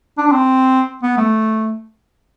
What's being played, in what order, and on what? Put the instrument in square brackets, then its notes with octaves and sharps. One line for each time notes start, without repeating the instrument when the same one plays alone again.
[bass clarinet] D4
D4
C4
B3
A3